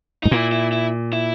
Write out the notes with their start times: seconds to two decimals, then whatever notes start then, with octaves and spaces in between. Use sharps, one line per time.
0.23 G#2 D#4
0.31 A#2 E4
0.52 E4
0.72 E4
1.13 E4